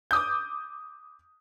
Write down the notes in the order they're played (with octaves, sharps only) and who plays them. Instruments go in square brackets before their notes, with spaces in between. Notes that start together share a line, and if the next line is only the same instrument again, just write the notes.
[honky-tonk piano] D6 D#6 G6